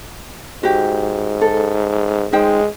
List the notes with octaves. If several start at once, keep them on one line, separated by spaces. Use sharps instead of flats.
G#2 F#4 G4
A4
G#3 D#4 C5 G5